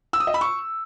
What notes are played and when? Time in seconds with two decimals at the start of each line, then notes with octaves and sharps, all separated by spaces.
0.13 E6
0.20 D#6
0.27 D#5
0.34 B5
0.41 C#6